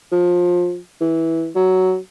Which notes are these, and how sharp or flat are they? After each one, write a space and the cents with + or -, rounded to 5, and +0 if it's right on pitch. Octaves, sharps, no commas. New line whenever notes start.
F3 +20
E3 -10
F#3 +10